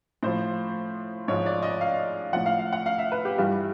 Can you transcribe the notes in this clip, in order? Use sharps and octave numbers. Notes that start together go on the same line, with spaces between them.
A2 F3 C5
G#2 F3 C#5
D5
D#5
F5
A2 F3 F#5
F5
F5
F#5
F5
E5
B4
G4
G2 E3 G3 F4